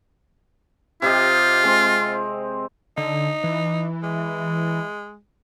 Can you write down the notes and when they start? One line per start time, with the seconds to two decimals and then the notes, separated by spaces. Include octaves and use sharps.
1.02 C3 F4 G4 D#5
1.63 G#3 C4
2.97 D3 D#4
3.44 E3
4.03 G#3